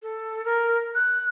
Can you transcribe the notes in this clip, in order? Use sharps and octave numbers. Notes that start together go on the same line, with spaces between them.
A4
A#4
F#6